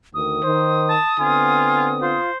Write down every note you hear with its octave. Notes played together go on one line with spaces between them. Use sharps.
D2 D#3 D#6
D#3 C5
A5
D3 B3 C4 F4 G#5
F4 C5